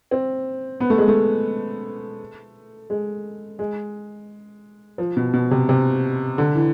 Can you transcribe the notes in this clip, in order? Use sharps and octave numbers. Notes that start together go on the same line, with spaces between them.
C4
B3
A3
G#3
A3
G#3
G#3
F3
B2
B2
C3
C3
D3
E3